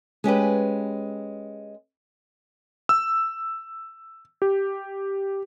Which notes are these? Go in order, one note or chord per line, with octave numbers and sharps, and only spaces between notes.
G#3 C#4 G4 B4
E6
G4